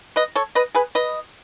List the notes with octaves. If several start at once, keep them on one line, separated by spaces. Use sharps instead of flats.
B4 D#5
A4 C#5
B4 D#5
G#4 B4
B4 D#5